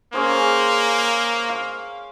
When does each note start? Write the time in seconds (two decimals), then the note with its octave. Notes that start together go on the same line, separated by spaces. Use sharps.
0.14 A#3 C#4 G#4 C5
1.50 F5